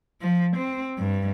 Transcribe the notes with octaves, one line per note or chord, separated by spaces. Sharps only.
F3
C4
G2